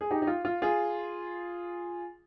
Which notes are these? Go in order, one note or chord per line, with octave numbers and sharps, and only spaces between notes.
G#4
D#4 G4
D#4
F4
F4
F4 G#4